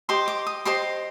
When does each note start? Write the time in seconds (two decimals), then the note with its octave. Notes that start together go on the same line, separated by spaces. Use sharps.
0.09 G4 C5 D#5 C6
0.28 D6
0.47 D#6
0.65 G4 C5 D#5 C6